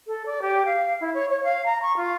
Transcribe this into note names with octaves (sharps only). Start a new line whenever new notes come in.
A4
D5
G4
F5
E4
C#5
C#5
F5
A#5
C#6
F4